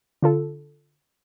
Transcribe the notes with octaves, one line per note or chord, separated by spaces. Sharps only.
D3 F4 A4